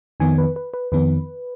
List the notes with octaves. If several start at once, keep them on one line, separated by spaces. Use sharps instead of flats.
F2 D#3 B3 G#5
B4
B4
B4
F2 D#3 B3 B4